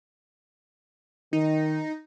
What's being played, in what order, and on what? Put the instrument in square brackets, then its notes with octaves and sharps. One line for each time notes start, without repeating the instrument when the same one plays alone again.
[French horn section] D#3 [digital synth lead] D#4